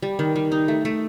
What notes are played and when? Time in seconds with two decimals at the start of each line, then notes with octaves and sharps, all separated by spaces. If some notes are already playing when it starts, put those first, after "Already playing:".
0.03 G3
0.19 D#3
0.36 G3
0.52 D#4
0.68 A3
0.85 A3